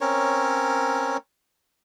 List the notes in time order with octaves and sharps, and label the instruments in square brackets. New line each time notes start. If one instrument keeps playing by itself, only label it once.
[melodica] C4 C#4 A#4 C#5